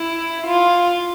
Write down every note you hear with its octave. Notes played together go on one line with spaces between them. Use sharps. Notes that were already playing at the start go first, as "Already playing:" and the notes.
Already playing: E4
F4